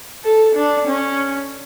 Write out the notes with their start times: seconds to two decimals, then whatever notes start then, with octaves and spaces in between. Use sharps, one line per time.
0.24 A4
0.55 D4
0.87 C#4